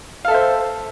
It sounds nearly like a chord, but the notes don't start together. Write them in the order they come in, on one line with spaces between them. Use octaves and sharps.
F5 A4 E5 C5